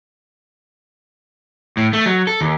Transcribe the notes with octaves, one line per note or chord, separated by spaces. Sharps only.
A2
A3
F#3
A4
D#2